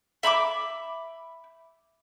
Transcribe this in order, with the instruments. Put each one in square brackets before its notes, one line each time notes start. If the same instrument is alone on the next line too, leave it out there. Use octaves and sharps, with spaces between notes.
[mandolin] E5 B5 C6 D6